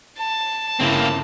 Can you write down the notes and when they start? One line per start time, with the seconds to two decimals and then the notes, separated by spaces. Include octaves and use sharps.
0.18 A5
0.80 G1 C#3 A#3 C4 E4